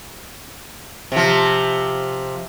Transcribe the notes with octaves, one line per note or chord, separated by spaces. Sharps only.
C3 F3